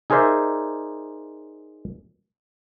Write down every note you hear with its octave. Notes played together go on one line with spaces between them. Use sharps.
D#4 G#4 A#4 C5 D5 E5